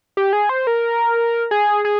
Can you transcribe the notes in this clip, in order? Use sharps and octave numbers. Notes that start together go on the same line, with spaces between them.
G4
G#4
C5
A#4
G#4
G#4